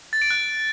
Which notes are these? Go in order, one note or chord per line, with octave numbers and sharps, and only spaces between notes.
A6
D7
F#6